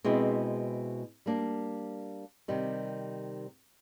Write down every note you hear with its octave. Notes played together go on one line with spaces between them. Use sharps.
B2 G#3 C4 E4
G3 A#3 D4
C3 D#3 G3